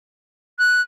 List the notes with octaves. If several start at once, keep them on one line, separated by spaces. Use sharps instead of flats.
F#6